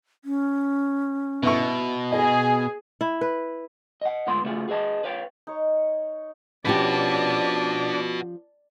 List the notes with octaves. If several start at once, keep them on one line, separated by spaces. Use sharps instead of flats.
C#4
B2 B3 E4 C#6
G#4 D#5 G#5
E4
B4
D#5 F#5
D2 G#2 B3 F4 C6
C#3 A3 B3 F4 F#4 G#4
G#4 B4 D#5 A5
B4 C#5 F5 G5
D#4 C#5
F3 C#4 D4 F#4 G4 B4 D5 A5